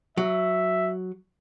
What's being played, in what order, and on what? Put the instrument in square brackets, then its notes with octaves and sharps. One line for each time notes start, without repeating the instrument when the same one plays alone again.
[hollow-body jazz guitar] F#3 [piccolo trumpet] E5